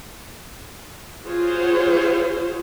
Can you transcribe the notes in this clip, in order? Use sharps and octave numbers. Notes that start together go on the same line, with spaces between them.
F4 F#4 G#4 C5 C#5